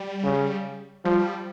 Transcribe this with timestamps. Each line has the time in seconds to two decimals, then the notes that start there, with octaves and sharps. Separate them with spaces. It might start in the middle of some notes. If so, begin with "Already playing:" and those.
Already playing: G3
0.23 C#3
1.05 F3 G3